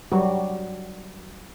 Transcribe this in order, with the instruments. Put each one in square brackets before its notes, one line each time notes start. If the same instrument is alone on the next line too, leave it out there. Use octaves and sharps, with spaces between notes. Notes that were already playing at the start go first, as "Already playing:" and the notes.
[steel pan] F#3 G3 F#4